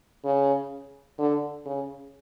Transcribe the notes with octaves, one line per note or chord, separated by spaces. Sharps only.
C#3
D3
C#3